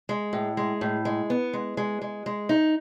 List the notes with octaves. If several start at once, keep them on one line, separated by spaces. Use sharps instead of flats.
G#3
A2
G#3
A2
G#3
B3
G#3
G#3
G#3
G#3
D#4